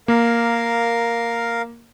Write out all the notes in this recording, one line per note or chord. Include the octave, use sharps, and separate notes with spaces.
A#3 A#4 F5